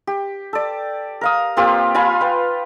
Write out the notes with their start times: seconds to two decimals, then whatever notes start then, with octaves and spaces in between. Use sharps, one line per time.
0.07 G4
0.53 A4 D5
1.21 A#4 F5 D#6
1.57 A#3 C4 F4 G4
1.95 F4 F5 G#5 B5
2.21 B4 G5